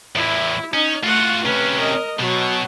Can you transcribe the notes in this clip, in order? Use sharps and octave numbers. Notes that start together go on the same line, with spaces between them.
E2 A2 E4
C#4 D#4
A3 F4 F#4 F#5
C3 C#4 B4
A#4 D#5
B2 F#3